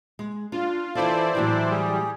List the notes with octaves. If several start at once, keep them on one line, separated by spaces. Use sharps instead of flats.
G#3
D4 F4
E3 E4 F4 A4 C5 D5
A2 E3 F#3 D4 G4
G3 G4 G#4